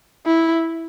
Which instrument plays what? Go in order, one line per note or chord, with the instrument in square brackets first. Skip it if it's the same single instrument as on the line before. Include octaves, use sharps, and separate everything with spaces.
[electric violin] E4